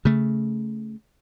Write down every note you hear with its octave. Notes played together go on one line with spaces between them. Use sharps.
C#3 A3